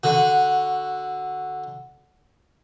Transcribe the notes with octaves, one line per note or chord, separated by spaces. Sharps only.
D3 F#4